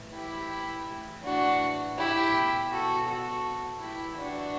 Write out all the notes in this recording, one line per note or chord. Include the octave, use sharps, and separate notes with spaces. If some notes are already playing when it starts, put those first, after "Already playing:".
Already playing: A2 E3
E4 G4
A2 E3
D4 F#4
E4 G4
B2
F#4 A4
F#4 A4
A2 E3 E4 G4
D4 F#4